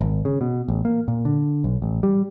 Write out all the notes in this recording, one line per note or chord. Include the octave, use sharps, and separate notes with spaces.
G#1
C#3
B2
A1
A#3
A#2
D3
B1
A1
G3